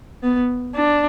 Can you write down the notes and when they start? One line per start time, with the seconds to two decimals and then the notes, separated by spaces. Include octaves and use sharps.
0.23 B3
0.75 D4